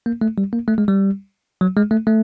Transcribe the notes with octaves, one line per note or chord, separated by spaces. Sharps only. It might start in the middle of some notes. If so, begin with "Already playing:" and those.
A#3
A3
G3
A#3
A3
G#3
G3
F#3
G#3
A3
A3